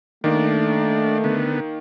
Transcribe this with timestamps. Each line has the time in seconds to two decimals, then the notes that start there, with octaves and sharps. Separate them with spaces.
0.24 D#3 A3 A#3 D4
1.24 D3 B3